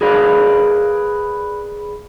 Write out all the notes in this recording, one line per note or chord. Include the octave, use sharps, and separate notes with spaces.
G#4 A#4 B4 D5 F5